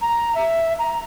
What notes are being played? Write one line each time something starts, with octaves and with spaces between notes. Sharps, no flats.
A#5
E5
A#5